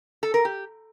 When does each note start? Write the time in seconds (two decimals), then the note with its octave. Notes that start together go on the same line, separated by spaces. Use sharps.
0.23 A4
0.34 A#4
0.45 G4